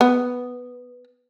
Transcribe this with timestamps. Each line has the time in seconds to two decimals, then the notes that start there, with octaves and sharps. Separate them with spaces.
0.01 B3